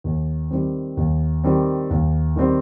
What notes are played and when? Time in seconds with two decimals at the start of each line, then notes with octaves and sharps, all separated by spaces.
0.04 D#2
0.51 D#3 G3 C4
0.97 D#2
1.44 D#3 G3 C4
1.90 D#2
2.36 D#3 G3 C4